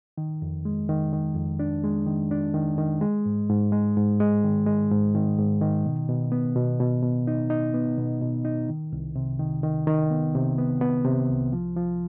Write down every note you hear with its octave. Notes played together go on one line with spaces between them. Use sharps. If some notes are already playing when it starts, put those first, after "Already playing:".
D#3
F2
G#3
D#3
D#3
F2
D4
G#3
D#3
D4
D#3
D#3
G#3
G#2
G#2
G#3
G#2
G#3
D#3
G#3
G#2
D#3
G#2
D#3
B2
B2
B3
B2
B2
B2
D#4
D#4
B3
B2
B2
D#4
D#3
C2
C3
D#3
D#3
D#3
B3
C3
B3
B3
C3
C2
F3
F3